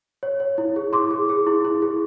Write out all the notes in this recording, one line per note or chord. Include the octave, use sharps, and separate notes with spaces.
C#5
C#5
E4
G#4
E4 C6 D6
G#4
G#4
E4
E4
G#4